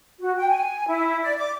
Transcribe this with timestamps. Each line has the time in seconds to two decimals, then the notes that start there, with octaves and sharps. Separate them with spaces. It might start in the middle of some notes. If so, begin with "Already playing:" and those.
0.20 F#4
0.37 G5
0.49 G#5
0.88 E4
1.22 D5
1.37 D6